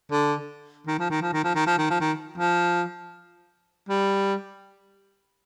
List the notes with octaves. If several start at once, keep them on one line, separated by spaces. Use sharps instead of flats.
D3
D#3
F3
D#3
F3
D#3
F3
D#3
F3
D#3
F3
D#3
F3
G3